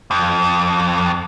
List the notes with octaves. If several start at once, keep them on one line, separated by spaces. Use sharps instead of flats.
F2